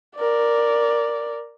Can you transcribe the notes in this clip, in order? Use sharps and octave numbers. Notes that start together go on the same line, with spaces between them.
A#4 D5